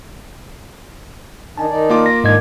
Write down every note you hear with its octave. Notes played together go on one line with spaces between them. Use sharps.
D#3 D4 D#4 G#5 A5
D#3 D#4 D5
A#3 F4 D6
A#6
G#2 D#3 D4 D#5 G#6